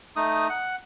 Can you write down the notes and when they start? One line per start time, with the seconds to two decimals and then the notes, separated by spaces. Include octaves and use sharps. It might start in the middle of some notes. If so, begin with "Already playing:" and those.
0.16 A3 D#4 D#6
0.50 F#5